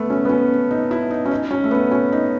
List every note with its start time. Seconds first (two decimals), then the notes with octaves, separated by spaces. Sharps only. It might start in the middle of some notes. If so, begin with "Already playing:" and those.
Already playing: A3 B3
0.10 C#4
0.25 B3
0.29 C#4
0.71 D#4
0.91 E4
1.11 D#4
1.25 C#4
1.31 D#4
1.51 C#4
1.64 A3
1.71 B3
1.91 C#4
2.12 D#4